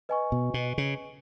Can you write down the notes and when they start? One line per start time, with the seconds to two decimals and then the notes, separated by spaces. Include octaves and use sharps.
0.09 B4 D#5 G#5 C#6
0.32 B2
0.54 B2
0.78 C#3